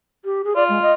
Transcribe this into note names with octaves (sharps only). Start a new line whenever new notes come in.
G4
G#4
F4 D5
G#3
D#5